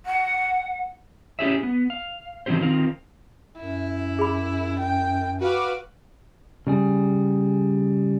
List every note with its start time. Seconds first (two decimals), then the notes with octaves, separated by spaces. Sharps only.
0.06 F#5
1.39 C#4 E4 G4 G#4 C#5 E5
1.63 B3
1.90 F5
2.46 D3 E3 F#3 C4 G4 C5
2.61 D#3 C4 F4 A#4 F5
3.58 F#2 E4
4.19 G#4 B5
4.80 G5
5.41 F#4 B4 F5 D6
6.67 C#3 G3 G#4